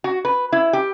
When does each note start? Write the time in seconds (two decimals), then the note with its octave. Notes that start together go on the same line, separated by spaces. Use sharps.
0.04 F#4
0.25 B4
0.52 E4
0.73 G4